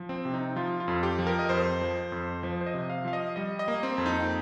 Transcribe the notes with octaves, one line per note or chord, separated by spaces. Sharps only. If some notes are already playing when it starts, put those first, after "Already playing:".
Already playing: F3
C4
C3
D#4
F3 F4
F4
F2
G4
F3
A#4
D#5
F2 C5
F3
F2
F3 C5
C5
D#5
C3
F5
F3 F5
D#5
G3 D#5
D#5
A#3
C4
F2
D#4